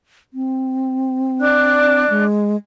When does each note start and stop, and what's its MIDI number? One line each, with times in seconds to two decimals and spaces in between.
0.34 2.05 60
1.39 2.24 62
1.39 2.24 74
1.39 2.24 90
2.10 2.56 56